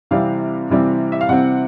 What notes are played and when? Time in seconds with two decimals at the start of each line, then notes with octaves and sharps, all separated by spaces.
0.11 C3 E3 G3 C4 F5
0.70 C3 E3 G3 C4
1.12 E5
1.21 F5
1.29 C3 E3 G3 C4 F#5